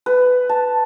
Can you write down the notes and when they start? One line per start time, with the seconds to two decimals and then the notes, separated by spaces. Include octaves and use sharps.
0.06 B4
0.49 A5